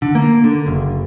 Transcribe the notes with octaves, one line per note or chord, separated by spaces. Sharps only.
D3
A#3
D3
F#1